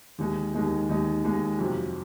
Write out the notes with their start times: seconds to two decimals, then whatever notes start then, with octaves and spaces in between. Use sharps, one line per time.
0.18 D#2 D#3 G#3 D#4
0.54 D#2 D#3 G#3 D#4
0.89 D#2 D#3 G#3 D#4
1.24 D#2 D#3 G#3 D#4
1.59 F2 C3 F#3